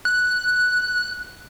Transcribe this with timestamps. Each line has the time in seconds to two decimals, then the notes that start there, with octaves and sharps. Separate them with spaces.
0.05 F#6